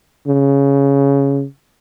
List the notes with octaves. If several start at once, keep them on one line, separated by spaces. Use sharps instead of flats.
C#3